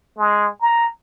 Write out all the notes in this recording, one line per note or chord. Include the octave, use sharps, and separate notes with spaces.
G#3
A#5